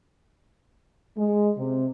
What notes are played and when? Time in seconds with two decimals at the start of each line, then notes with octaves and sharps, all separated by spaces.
1.17 G#3
1.57 C3